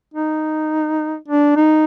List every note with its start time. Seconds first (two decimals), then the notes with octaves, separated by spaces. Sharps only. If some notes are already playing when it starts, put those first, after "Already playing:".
0.14 D#4
1.28 D4
1.56 D#4